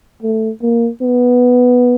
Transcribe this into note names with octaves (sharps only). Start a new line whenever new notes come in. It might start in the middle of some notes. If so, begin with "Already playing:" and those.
A3
A#3
B3